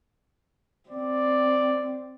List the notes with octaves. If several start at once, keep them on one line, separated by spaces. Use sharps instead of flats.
C4 D5